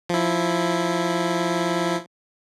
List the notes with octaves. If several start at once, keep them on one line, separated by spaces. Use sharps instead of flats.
F3 E4